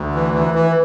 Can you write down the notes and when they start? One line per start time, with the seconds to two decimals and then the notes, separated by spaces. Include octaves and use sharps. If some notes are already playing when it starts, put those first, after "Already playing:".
Already playing: D2
0.14 E3
0.34 E3
0.55 E3